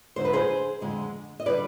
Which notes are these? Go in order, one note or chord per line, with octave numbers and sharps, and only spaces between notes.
F2 D3 G#3 C5
B4
G#4 C5
F2 D3 G#3
D#5
D3 G3 B4 D5